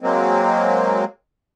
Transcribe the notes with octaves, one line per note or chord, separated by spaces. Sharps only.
F#3 G#3 A#3 C4